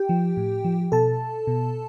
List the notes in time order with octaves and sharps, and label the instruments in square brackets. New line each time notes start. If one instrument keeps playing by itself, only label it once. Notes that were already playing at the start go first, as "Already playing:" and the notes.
Already playing: [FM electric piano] G4 G5
F3
A2
F3
B2 A4 A5
B2